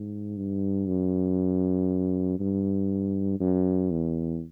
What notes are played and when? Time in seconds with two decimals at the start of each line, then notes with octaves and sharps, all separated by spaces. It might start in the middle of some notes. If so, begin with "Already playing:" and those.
Already playing: G#2
0.37 G2
0.87 F#2
2.40 G2
3.40 F#2
3.91 E2